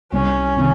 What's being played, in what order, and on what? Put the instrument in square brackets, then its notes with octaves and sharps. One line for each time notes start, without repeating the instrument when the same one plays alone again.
[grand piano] C2 [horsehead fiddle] C#4
[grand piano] C3 D#3